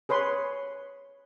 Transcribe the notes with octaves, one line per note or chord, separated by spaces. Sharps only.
G#4 B4 C#5 C6